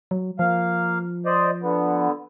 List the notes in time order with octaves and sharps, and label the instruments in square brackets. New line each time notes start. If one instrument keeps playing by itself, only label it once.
[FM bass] F#3
[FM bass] F3 [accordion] A#3 F5
[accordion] C5 D5 D#5
D3 B3